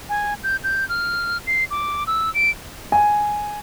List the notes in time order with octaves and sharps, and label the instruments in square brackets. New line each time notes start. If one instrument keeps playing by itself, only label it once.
[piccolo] G#5
G6
G6
F6
C7
D6
E6
D7
[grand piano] G#5